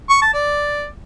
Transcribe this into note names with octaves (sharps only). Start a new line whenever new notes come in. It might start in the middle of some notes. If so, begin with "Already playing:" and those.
C#6
A5
D5